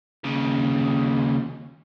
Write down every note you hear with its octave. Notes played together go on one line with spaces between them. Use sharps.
D#2 C#3